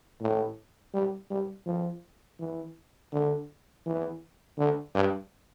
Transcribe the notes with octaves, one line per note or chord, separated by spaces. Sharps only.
A2
G3
G3
F3
E3
D3
E3
D3
G2